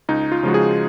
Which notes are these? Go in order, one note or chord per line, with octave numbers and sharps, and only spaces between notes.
C#2 D#4
F4
C#3 F3 G#3 F#4
G#4